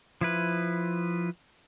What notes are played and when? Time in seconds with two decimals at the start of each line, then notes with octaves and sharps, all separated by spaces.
0.21 F3 E4 B4